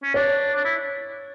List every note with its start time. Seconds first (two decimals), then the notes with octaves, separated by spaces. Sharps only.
0.03 C#4
0.14 D4 C#5
0.55 D4
0.65 E4